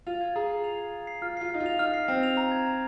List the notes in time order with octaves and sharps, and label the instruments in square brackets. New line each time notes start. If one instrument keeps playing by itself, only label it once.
[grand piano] F4 [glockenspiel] F7
[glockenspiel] G#6
[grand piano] G#4 [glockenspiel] A#5
[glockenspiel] C7
F7
G#6
A#5
C7
[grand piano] F4 [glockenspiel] F6
[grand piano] F4 [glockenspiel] C7
[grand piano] D#4 [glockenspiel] F6
[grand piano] F4
[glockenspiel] F7
[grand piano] D#4 [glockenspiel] F6
[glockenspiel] C7
[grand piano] C4 [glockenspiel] F6
[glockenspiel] F7
A#5
G#6
A#5